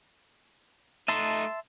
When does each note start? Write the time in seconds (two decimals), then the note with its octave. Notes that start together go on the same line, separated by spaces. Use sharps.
1.08 A3 D#4 E5 A5 C6